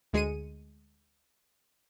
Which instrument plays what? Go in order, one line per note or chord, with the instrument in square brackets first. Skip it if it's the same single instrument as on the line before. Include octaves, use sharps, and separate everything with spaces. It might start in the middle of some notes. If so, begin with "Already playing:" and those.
[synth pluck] D2 G#3 G#4 C#7 D#7